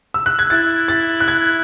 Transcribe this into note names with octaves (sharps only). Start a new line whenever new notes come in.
E6
F#6
G#6
E4 A6
A6
F#6
G#6